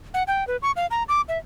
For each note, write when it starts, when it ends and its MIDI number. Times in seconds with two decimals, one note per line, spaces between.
0.14 0.23 78
0.28 0.46 79
0.47 0.57 71
0.62 0.72 85
0.76 0.87 77
0.91 1.03 82
1.09 1.21 86
1.29 1.38 76